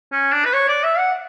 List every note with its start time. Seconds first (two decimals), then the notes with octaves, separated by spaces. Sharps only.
0.12 C#4
0.33 D4
0.45 B4
0.53 C#5
0.68 D5
0.84 E5
0.98 F#5